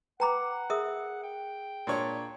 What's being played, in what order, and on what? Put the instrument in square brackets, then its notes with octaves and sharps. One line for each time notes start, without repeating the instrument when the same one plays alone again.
[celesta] B4 D6 [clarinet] F#5 [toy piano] G5 A#5 B5
[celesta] G#4 [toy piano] A#4 E5 D#6
[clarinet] G5
[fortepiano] A#2 D4 C#5